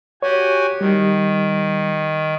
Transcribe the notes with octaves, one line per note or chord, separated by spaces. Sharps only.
F#4 G4 C#5 G#5
D#3 G3